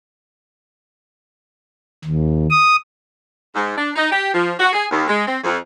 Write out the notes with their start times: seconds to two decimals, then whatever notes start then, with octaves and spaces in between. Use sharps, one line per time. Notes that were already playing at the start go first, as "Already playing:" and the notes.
2.04 D#2
2.50 D#6
3.54 G#2
3.77 D4
3.96 D#4
4.11 G4
4.34 F3
4.60 F#4
4.73 G#4
4.91 D#2
5.08 G#3
5.27 C4
5.44 F2